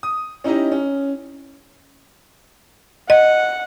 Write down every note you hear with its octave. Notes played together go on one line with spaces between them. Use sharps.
D#6
C#4 D#4 E4 G4 D#5
C#4
D#5 F#5